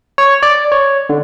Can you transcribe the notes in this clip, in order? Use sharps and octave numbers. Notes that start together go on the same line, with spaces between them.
C#5
D5
C#5
D3